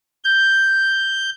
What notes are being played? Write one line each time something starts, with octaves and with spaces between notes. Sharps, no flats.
G6